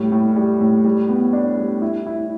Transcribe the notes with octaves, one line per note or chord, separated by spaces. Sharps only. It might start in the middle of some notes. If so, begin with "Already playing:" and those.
Already playing: A2 G3
A2
G3
A2
G3
B3
D4
G3
E4
E4